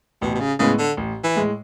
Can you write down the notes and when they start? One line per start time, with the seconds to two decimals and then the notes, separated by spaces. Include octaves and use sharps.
0.22 A1 B2
0.35 B2
0.40 C#3
0.59 A2 C#3 G#3 B3
0.79 D3
0.97 A1
1.23 E3
1.36 A2 G#3